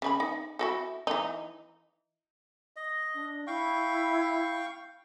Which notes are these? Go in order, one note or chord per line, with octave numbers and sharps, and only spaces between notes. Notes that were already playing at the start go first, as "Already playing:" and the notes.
C#3 D#4 B5
D#4
E4 F#4 A4
E3 D#4
D#5
D4
E4 F5 G5 C#6